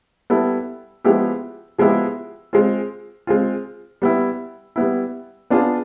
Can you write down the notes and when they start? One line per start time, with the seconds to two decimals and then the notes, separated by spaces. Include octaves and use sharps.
0.30 G3 B3 E4 A4
1.05 F3 G#3 B3 E4 G4
1.79 F3 G#3 B3 E4 G4
2.53 G#3 C4 F4
3.27 G#3 C4 F4
4.02 G3 B3 E4
4.76 G3 B3 E4
5.50 B3 D4 F4 G#4